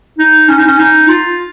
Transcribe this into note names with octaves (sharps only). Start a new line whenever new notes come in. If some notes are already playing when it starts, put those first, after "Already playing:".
D#4
C#4
D#4
C#4
D#4
F4